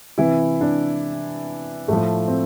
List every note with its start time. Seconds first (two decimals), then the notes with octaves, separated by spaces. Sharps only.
0.18 C3 E3 E4
0.61 D4
1.88 A2 F3 A3
2.28 C4